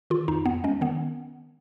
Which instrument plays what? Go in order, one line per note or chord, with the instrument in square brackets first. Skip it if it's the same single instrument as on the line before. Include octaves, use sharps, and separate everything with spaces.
[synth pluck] D#3 F4
F2 D#4
F2 B3
G#3 C#4
D#3 B3